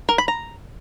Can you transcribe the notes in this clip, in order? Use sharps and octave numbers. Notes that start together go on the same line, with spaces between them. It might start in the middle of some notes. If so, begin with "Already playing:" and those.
A#4
B5
A#5